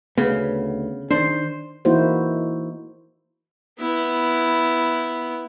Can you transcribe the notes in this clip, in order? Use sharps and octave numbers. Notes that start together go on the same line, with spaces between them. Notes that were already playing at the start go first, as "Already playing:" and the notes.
D2 C#3 B3
D#3 D4 C5
E3 A#3 D#4 E4 F#4 C5
B3 E4